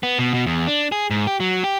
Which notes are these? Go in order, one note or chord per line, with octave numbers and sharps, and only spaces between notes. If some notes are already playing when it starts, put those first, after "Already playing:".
B3
B2
B2
E2
D4
G#4
G#2
G4
F#3
G4